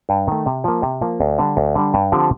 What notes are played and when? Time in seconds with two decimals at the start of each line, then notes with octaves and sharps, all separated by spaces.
0.09 G2
0.27 D#3 A3
0.46 C3
0.64 F3 A#3
0.82 C3
1.02 F3 A#3
1.20 D2
1.39 D3 G3 D4
1.57 D2
1.75 D3 G3 D4
1.94 G2
2.12 D3 F3 C4 G4